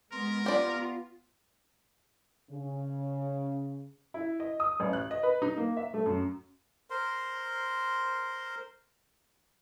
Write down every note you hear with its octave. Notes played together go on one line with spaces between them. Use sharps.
G#3 B3 A#4 C6
B3 F4 G4 D5
C#3
E4
D#5
D#6
A1
F#6
D#5
B4
D#4
A#3
E5
A3
F#2
A#4 C5 C6